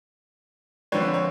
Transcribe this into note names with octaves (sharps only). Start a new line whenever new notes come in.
D3 F3 G#3 C4 B4 C#5
C#5